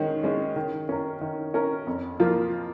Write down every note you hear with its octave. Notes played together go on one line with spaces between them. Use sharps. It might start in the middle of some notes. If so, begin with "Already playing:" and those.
Already playing: D#3 G#3 C#4
G#3 C#4
D#3
C#4 A#4
D#3
C#4 A#4
F2
F3 A#3 F4